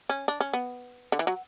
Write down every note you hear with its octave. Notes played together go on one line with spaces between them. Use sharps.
C#4
D4
C#4
B3
D3
E3
F#3